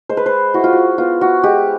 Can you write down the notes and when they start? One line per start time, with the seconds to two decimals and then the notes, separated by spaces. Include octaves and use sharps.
0.09 G#3 C5
0.17 B4
0.26 C5
0.54 E4 F#4
0.64 F4
0.73 F#4
0.98 B3 F4
1.21 F#4
1.43 G#3 G4